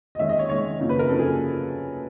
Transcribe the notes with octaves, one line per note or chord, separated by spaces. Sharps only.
D#5
D#3 G#3 C#4 E5
D#5
C#5
D#3 G#3 C#4 C#5
F#2 C#3 F3 A#3 D#4
B4
A#4
F#2 C#3 F3 A#3 D#4 A4
G#4